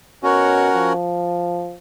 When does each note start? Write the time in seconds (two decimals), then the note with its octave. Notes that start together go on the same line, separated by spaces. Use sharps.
0.23 B2 C#4 F#4 A#4 C#5 F#5
0.73 F3